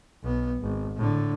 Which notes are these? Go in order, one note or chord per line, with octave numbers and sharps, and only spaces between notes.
B1 B3
G#1
A2 D3